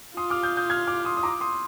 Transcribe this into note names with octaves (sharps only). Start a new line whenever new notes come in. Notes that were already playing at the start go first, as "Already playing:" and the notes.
F4 C6 D#6
D6 F6
D#6 G6
D#6 G6
F6 G#6
D6 F6
C6 D#6
D#6
A#5 D6
C6 D#6